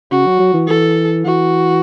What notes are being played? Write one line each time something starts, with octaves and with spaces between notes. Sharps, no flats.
C#3 F#4
F#3
F#3
E3
E3 A4
E3 F#4